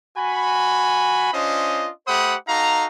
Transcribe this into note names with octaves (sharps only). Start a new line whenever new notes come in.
F#4 G#5 B5
C#4 D4 F4 C5 D#5
A3 G4 C5 F#5 B5 D#6
D#4 F#4 A4 F5 A#5